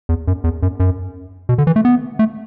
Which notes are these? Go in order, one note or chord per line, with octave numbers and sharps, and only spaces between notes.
E2
F#2
E2
F#2
F#2
B2
D3
E3
A3
B3
A3